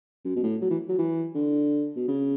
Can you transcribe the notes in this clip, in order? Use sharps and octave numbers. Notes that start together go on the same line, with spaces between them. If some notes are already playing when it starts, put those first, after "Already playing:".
F#2
B2
A2
F#3
E3
F#3
E3
D3
B2
C#3